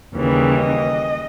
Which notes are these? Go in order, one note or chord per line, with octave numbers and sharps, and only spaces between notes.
D#2 C#3 E3 G3
D#5